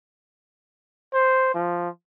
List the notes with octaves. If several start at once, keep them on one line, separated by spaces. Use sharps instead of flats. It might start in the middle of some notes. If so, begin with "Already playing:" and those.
C5
F3